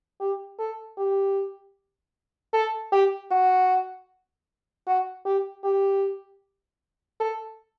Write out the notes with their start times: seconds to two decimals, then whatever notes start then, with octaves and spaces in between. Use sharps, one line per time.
0.20 G4
0.59 A4
0.98 G4
2.54 A4
2.92 G4
3.31 F#4
4.87 F#4
5.26 G4
5.64 G4
7.20 A4